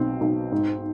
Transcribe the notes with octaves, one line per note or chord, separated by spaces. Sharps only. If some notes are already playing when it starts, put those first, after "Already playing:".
Already playing: B1 B2 C4
B1
G#2